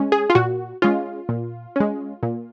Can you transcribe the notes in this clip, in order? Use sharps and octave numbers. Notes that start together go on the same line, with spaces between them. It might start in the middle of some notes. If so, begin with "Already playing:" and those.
Already playing: G#3 C#4
G#4
F4
A#2 F#4
G#3 C#4 F4
A#2
G#3 C#4
A#2